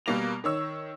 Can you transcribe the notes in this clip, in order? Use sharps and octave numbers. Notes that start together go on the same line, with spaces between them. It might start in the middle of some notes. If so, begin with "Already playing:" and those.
B2 G3 A#3 A#6 F7
D#3 C#5 E6